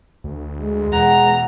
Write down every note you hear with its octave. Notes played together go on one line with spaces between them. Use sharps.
D2
G#3
E2 B2 F#5 A#5